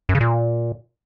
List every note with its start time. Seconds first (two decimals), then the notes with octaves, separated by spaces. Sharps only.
0.09 F#2
0.15 C#3
0.21 A#2